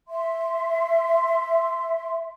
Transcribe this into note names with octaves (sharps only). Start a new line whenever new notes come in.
E5 C6